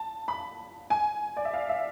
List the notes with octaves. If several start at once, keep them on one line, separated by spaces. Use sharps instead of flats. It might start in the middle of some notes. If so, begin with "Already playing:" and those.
Already playing: A5
B5
G#5
D5
E5
F5
E5